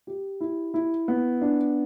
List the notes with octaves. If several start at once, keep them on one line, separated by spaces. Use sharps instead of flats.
G4
E4
E4
B3
D4